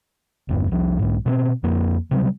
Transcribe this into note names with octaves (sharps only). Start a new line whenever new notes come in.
G1 E2 G2
C2 F3
B1 G#2
B2 G#3 C4
F2 A#3
C3 F#3 G3